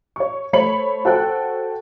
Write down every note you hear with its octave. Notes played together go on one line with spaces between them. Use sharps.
C#5 C#6
A3 C5 C#5 B5 C#7 F#7
F#4 A4 C5 G5 F#6